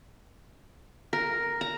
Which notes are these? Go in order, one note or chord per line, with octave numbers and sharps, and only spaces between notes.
A#4
A#5